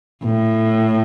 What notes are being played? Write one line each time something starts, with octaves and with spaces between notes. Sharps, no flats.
A2